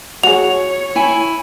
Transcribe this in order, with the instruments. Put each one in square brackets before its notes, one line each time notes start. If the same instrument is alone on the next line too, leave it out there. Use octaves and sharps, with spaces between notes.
[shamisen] F#4 G#4 [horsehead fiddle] C#5 [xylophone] F7
[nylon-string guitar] E4 G#5